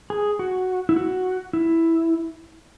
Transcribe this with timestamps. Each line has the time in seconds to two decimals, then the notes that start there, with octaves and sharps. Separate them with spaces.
0.10 G#4
0.39 F#4
0.89 E4
0.96 F#4
1.53 E4